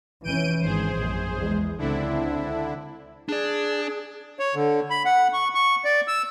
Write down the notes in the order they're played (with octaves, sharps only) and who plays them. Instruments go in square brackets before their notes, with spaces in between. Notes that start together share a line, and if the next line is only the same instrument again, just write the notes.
[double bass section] F1 E3 C#4 [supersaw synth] G6 D7 D#7
[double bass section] G#1 [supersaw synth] G#4 C5
[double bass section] A#1 F#2
E2 G#3
[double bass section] C#2 C4 [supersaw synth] D3 D4 E4
[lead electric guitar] D4 D5 [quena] G#4
[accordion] C#5
D3
B5
F#5
C#6
C#6
D5
E6